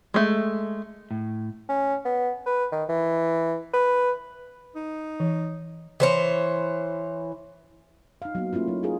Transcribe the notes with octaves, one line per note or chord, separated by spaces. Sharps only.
G#3 A3
A2
C#4
B3
B4
D#3
E3
B4
D#4
E3
E3 C5 C#5
D#4 F5
F#3 A#3 B3
A3 A#3 C#4 E4 F4
F#3 D#4
D#4 F4 G#4 A#4